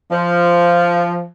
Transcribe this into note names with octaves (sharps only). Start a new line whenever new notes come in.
F3